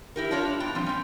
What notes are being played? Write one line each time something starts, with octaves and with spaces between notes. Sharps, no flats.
E4 G4 A#4
D4 E4 F4 A#4 C#5
G2
B2 D4 G5 A#5
F3 G3 C4
C4 C#4